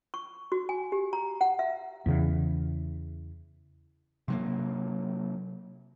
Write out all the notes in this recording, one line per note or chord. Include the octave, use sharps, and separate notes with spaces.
C#6
F#4
G#5
G4
A#5
F#5
E5
E2 C#3 E3
C3 F#3 A#3